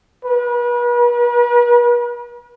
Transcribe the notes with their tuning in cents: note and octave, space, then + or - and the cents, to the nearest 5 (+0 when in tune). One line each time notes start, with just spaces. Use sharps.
B4 -40